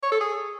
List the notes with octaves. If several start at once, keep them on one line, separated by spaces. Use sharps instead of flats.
C#5
A4
G#4